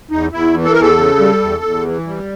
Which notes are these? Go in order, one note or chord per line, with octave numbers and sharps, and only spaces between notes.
E2 D#4
E2 E4
E3
A4
A#4
E2 A4
C#3
G3
E2
E2
E3
G3